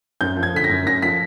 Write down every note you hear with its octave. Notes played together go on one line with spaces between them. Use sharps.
F#2 G6
F3
G#6
D3 B6
A#6
F#2
F#2 A#6
F3 B6